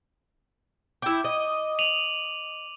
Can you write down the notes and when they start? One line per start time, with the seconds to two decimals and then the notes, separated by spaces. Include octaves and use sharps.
1.02 E4 G5 D6
1.24 D#5
1.79 D#7 F7 F#7